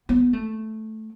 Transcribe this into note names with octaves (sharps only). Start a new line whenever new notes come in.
B3
A3